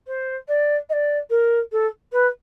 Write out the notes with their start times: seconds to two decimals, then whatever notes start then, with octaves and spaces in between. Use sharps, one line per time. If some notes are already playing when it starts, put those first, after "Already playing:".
0.07 C5
0.48 D5
0.89 D#5
0.92 D5
1.30 A#4
1.72 A4
2.12 B4